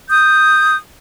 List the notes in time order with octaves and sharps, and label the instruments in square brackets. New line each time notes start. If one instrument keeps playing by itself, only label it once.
[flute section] D#6 G6